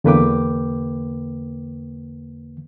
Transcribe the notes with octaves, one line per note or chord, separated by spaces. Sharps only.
E2 D3 A#3 B4 G5 D6